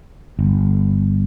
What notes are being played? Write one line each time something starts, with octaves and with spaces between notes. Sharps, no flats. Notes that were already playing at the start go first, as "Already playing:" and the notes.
G1